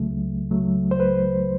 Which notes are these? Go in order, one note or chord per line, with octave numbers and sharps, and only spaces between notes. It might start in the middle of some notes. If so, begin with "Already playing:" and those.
Already playing: C#2 C#3 F#3 A3
C#2
C#3 F#3 A3
C#2 C5
B4